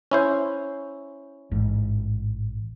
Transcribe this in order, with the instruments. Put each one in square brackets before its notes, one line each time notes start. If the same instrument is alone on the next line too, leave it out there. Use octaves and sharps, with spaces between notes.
[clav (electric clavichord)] C#4 E4 C5
[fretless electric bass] A1 G#2